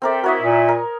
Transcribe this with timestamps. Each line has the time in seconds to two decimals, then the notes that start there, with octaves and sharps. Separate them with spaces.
0.02 C4 A4 A#4 D5 E5 G5
0.24 E4 F#4 A#4 C#5 D#5 E5
0.41 A#2
0.69 A#4